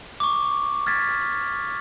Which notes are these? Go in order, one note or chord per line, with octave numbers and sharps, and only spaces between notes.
C#6 D6
F6 G#6 A6 B6